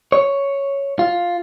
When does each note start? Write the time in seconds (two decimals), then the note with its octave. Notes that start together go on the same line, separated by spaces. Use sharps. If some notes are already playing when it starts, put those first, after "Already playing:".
0.12 C#5
0.99 F4